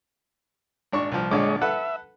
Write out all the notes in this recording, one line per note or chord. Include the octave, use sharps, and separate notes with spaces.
G#1 D4 C#6
C2 F3
A#1 D3 G#3 C#5 D#5 D6
A4 B4 E5 F#5